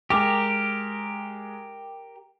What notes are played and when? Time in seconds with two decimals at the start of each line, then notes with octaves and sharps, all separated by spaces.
0.10 G#3 G4 A#4 D6